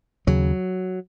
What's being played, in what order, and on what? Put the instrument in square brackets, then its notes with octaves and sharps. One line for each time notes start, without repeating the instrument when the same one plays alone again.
[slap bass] D#2 C#3 F#3